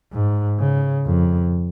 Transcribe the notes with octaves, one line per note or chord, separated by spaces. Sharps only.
G#2
C#3
F2